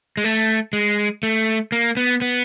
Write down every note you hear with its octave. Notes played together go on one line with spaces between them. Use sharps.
G#3
A3
G#3
A3
A#3
B3
B3